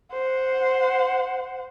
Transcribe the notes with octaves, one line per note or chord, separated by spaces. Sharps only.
C5 F#5